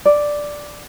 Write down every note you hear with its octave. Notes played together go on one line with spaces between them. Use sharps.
D5